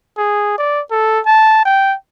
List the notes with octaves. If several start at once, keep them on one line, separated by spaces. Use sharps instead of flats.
G#4
D5
A4
A5
G5